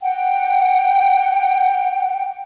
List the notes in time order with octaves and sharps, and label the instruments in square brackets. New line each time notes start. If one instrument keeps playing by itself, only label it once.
[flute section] F#5 G5